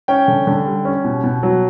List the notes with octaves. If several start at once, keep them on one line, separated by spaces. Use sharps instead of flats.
C#4 G5
D3
D3
G3
C#4
B2
B2
F#3